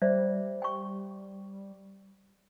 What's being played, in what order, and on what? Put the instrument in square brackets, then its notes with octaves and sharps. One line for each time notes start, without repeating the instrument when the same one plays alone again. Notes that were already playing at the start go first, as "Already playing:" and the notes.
[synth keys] G3 [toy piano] C5 D5 E5
[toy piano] G5 C#6